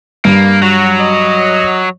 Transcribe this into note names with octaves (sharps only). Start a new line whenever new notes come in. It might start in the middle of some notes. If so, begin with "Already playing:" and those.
G2 A#3
F#3 F#4
D#5